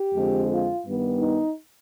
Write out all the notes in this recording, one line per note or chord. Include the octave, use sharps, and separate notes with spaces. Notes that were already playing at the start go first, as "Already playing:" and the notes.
Already playing: G4
F2 D3 G#3 C4
F4
G2 D#3 G3 B3
D#4